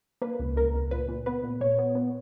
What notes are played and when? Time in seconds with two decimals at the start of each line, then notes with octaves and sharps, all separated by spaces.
0.22 A#3 B4
0.39 C#2
0.56 C#2 A#4
0.74 C#2
0.91 A#2 B4
1.08 A#2
1.26 B3 B4
1.43 A#2
1.61 A#2 C#5
1.79 B3
1.95 B3